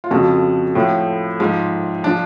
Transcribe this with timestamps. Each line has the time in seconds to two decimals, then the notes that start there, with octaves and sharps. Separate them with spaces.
0.04 F4
0.11 F2 C#3 F3 F#4
0.75 A2 F3
1.40 G#2 F3
2.04 F3 D4